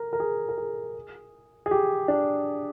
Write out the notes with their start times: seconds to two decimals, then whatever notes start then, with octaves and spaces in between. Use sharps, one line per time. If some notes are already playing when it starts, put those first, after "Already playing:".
Already playing: A#4
0.13 A#4
0.20 G#4
0.49 A#4
0.58 G#4
1.66 G#4
1.71 G4
2.08 D4